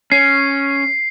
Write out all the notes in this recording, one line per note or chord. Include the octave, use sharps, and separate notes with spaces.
C#4 C7